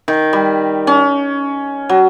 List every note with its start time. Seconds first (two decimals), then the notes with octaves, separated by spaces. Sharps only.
0.08 D#3
0.33 G3
0.87 C#4
1.89 F#3